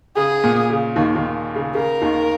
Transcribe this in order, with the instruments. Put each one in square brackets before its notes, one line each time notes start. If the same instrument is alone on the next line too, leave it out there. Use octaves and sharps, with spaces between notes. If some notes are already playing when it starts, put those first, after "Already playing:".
[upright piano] C#3 [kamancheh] G#4
[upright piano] A#2
C#3
D#2 D#3
D#2 D#3
C#3
[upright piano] C#3 [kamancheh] A#4
[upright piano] D#2 D#3